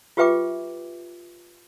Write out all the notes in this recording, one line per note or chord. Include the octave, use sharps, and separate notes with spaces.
F4 G4 B4 E5 G5 D6